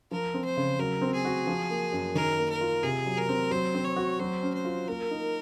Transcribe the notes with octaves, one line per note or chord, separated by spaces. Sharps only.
F3 A#4
C4
C5
C#3
F#3 A#4
C4
G#4
F#4
F3
A#3
F#2
D#3 A#4
A#3
A#4
F4
C3 G#4
F#3
A#4
C4
F#3 C5
C4
C#5
F#4
F#3 C5
C#4
C5
F4
A#3 A#4
D#4